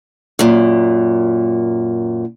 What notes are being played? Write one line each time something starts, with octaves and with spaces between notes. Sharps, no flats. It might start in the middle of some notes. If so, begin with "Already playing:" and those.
F#2 A#2